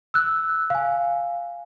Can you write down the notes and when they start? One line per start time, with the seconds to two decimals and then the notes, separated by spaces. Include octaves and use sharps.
0.14 E6 F#6
0.70 F5 G#5